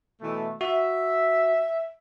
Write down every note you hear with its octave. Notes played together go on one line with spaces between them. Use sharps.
B2 E3 A3
F#4 E5